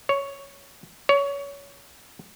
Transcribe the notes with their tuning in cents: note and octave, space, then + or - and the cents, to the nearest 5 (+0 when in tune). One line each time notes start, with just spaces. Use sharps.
C#5 +5
C#5 +25